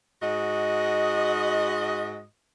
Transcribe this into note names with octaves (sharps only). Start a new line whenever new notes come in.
G#2 F#4 D#5